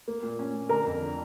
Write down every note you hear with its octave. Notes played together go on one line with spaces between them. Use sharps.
A#3
A#2
C#4
A#2
D3 A#4 A#5
F2
D3